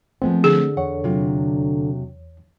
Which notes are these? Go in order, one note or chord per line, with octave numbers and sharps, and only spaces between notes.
F3 G#3 A3 B3 C4
D3 G#4
E2 C#5 F#5
C3 F#3 F4